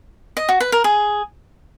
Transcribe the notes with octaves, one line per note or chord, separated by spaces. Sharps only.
D#5
F#4
B4
A#4
G#4